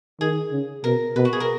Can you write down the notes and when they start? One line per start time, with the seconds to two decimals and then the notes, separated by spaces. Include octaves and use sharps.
0.20 D#3 G#4
0.52 C#3
0.84 B2 A#4
1.16 B2 B4
1.25 F#4
1.33 G#4
1.40 A#4